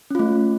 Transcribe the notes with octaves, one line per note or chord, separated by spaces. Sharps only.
A3 C#4 F4